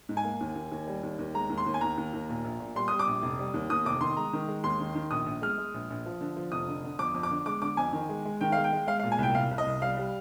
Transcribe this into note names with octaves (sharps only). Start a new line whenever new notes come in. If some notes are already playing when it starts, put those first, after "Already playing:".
G#2
G#5
A#3
D#2
D#2
D#2
G3
D#2
D#2
G#3 A#5
D#2
C6
D#2
G#5
D#2 A#5
D#2
D#2
A#2
A#1
A#2
G3 C6
G3 D#6
D6
A#1
F1
G3
D#2
D#2 D#6
F1 D6
D#3 C6
G#3 A#5
D#3
G#3
D#2 C6
D#3
D#3
A#1 D#6
A#1
G#3 F6
G#3
A#1
A#1
F3
D3
F3
F1 D#6
D3
D3
F2 D6
F2
D6
D3
G#3 D6
D3 D6
F2 G#5
D#3
G#3
G#3
D#3 G5
G#3 F5
G5
G#3
G#3 F5
A#2 F5
G#5
C2 G5
C2 F5
C2
D#5
C2
G3 F5
G3